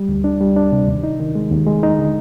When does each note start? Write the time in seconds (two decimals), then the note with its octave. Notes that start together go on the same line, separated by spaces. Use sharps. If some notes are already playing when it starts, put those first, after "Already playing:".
Already playing: G3
0.09 D2
0.24 D4
0.41 G3
0.56 D4
0.72 C3
0.88 D#2
1.04 D#4
1.20 D#3
1.35 G#3
1.51 D#2
1.66 G#3
1.83 D#4
1.99 D3